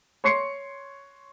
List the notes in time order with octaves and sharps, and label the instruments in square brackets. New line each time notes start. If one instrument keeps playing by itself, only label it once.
[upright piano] C#5 C6 C#6 C7 C#7